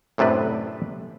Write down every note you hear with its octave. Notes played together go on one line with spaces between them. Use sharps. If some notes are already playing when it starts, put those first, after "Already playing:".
F#2 A2 C3 D4 B4